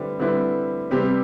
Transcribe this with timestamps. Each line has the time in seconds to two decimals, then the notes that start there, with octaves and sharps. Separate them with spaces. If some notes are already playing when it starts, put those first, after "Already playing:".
Already playing: D3 G3 C4 E4 B4
0.19 D3 G3 C4 E4 B4
0.91 C3 G3 C4 G4 B4